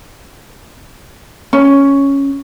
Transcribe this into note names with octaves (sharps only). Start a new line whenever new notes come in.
C#4